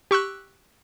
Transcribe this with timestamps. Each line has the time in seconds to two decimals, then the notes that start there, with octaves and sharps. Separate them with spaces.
0.11 G4 C#6 E6 F#6